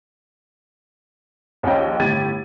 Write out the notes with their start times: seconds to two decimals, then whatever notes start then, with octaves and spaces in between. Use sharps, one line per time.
1.63 A#1 D#2 C#4 D#5 G5
2.00 G1 A2 G4 G#6 A6 D#7